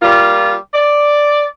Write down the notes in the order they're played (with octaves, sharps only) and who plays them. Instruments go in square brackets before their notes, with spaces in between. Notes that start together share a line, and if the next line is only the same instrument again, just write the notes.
[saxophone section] G3 A#3 F4
D5